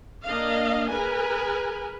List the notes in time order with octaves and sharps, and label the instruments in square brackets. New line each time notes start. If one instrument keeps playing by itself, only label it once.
[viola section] A#3 D4 D#5 F5
G#4 A#4 B4 G#5